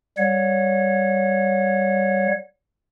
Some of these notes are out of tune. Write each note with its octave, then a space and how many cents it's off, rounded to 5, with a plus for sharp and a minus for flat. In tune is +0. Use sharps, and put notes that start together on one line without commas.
G3 +0 C#5 +0 F#5 -35